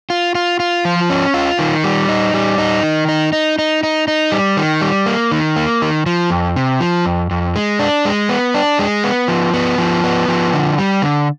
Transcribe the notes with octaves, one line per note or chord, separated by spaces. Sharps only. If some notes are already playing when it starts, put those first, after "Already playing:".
F4
F4
F4
F3
C#4
F4
D#3
G3
D#4
G3
D#4
D#3
D#4
D#4
D#4
D#4
D#4
G3
D#3
G3
A#3
D#3
A#3
D#3
F3
F2
C3
F3
F2
F2
G#3
D4
G#3
B3
D4
G#3
B3
F3
B3
F3
B3
F3
D3
G3
D3